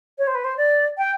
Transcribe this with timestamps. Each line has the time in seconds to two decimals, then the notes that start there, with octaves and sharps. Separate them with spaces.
0.18 C#5
0.27 C5
0.34 B4
0.44 C5
0.57 D5
0.97 G5